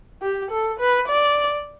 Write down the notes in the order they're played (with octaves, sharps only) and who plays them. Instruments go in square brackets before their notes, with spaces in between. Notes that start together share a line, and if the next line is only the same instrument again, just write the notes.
[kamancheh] G4
A4
B4
D5